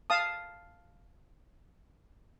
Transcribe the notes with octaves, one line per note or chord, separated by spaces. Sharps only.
F5 A5 D#6